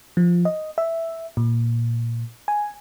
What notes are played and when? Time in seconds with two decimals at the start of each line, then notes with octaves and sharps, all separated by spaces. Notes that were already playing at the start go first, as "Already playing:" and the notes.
0.17 F3
0.45 D#5
0.78 E5
1.37 A#2
2.48 G#5